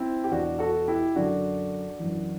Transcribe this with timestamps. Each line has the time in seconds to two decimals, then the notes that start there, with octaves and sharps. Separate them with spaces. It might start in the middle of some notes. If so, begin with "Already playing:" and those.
Already playing: C4 E4
0.24 G4
0.31 E2 B2 D4 F#4
0.59 F#4 A4
0.88 E4 G4
1.15 F#2 D3 D4 F#4
1.99 F#2 E3